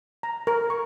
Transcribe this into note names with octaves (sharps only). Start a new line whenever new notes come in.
A#5
A#4
C#6